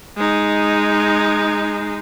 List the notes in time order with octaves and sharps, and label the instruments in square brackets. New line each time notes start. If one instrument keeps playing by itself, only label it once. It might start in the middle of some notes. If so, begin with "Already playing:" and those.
[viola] G#3 D#4